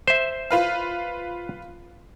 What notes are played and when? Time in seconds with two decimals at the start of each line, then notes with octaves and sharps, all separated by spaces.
0.08 C5 E5
0.51 F4 B4 F5